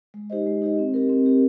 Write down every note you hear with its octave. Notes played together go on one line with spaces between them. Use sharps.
G#3
D#4 G4 C5 D#5
G#3
D#4 G4 C5 D#5
C4
G4 A#4
C4
G4 A#4